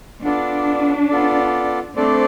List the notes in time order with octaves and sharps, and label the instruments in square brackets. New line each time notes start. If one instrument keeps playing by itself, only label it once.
[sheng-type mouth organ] B3 F4 A4 D5 [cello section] D4
[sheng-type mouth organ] B3 F4 A4 D5
[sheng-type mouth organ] A3 D4 A4 D5 [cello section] C4